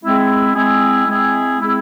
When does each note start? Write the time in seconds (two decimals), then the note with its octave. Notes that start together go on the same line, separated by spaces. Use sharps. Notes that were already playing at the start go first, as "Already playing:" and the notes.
0.02 G#3 C4 E4 G#4
0.54 G#3 C4 E4 G#4
1.07 G#3 C4 E4 G#4
1.59 G#3 C4 E4 G#4